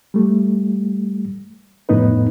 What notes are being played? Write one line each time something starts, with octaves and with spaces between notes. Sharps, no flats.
G3 A3
F2 A2 B3 D#4 B4